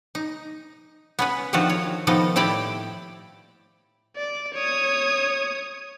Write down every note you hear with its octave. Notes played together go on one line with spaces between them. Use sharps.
D#4
B3 C#4 B4
D3 D#3 F3 C4 F4 F#4
C#5
D#3 F3 B3 D#4 A4
A2 E4 G4 D5 G5
D5
C#5 D#6